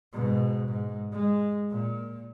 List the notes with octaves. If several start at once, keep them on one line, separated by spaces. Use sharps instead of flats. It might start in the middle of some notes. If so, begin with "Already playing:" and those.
G#2 B2
G#2
G#3
A#2